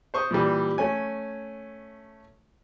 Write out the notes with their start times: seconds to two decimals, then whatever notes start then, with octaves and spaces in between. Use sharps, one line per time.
0.14 C5 C#6 D#6
0.31 A#2 E3 G3
0.78 A3 C#4 G#5